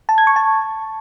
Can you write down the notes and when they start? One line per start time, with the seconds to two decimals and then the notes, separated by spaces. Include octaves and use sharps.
0.09 A5
0.18 G#6
0.27 C#6
0.36 A5